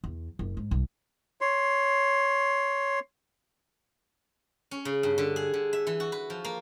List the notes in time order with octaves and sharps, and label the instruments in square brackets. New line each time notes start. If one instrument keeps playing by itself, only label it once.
[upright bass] E2
F#1
G#2
C2
[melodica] C#5 C6
[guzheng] C#4
C#3
G2
D3
G#4
D3
E5
E3
F#4
B4
F3
A#3